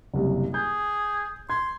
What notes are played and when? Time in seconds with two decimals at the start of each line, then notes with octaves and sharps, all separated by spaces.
0.14 F#1 C2 C3
0.54 G#4 G6
1.50 C6 G#6